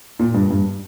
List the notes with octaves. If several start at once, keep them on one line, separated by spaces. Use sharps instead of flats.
A#2
G2
G2